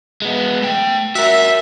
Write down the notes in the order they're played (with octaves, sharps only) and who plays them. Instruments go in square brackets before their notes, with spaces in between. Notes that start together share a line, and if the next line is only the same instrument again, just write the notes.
[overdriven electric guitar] G#3 B3
A3 G5
[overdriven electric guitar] F#4 A#4 [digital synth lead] E5